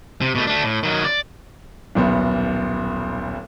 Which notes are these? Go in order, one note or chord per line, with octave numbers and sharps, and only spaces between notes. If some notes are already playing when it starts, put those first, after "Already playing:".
C3
B2 A3
A3 D4
A2
D#3 F#3
D5
D#1 B1 B3